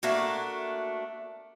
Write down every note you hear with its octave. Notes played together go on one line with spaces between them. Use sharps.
A3 A#3 D4 F#4